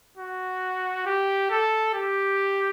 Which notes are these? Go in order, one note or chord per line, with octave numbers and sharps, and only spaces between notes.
F#4
G4
A4
G4